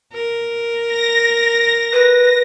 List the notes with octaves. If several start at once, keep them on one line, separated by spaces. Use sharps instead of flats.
A#4
A#6
B4